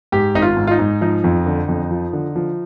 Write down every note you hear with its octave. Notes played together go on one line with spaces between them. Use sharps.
G#2 G4
G#1 D#4
F4
G#2
F4
D#4
G#2
F3 D#4
F2
D3
F2
F3
D3
F3